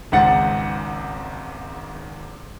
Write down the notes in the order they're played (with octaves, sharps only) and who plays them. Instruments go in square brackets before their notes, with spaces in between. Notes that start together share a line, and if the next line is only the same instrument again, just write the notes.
[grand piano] G#1 C#2 G#2 F#5 A6 C#7